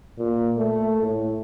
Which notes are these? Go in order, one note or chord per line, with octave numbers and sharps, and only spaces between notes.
A#2
A3
A2